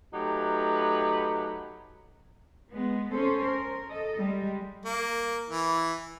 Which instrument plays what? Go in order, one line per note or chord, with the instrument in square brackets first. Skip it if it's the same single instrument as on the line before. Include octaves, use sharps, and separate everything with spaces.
[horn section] F#3 A3 D#4 G4 B4
[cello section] G#3 B3
C#4 A4 C5
A#4
A4 D#5
G3 G#3
[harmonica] A#3
E3